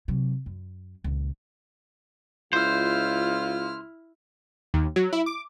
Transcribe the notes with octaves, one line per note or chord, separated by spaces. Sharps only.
C3 F#3
F#2
C#2 A#2
C#2 E4 F4 C5 F6
D#2
F#3
E4
D6